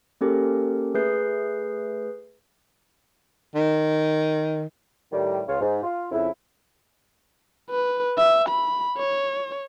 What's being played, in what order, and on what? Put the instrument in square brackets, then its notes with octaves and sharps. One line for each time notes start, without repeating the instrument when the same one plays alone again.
[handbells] A#3 C#4 G4 A4 A#4
A3 G#4 B4 G6 C7
[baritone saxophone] D#3
[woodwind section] A2 D#3 G3
C#2 C#3 F4 C#5
G#2
F4
F2 C#3 E4
[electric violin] B4
E5
B5
C#5